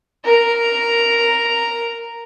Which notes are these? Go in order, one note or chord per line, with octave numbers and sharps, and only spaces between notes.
A#4 A#5